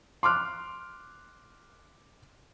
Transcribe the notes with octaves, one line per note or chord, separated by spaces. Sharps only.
C6 D6 F6 F#6